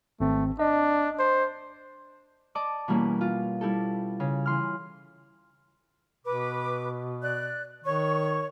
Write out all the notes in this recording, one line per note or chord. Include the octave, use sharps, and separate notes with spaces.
G#1 A3 C4
D4 D#5
C5
D5 D#5 A5 D6
B2 E3 G3 A#3 C#4 E4
F4
G3 E4 G4 A4
C#3
E3 C6 F6
B2 B4 D6
D5 F#6
D#3 C#5 C#6